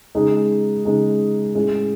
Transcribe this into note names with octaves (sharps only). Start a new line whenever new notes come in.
C#3 G#3 D#4 G#4
C#3 G#3 D#4 G#4
A2 G#3 C#4 G#4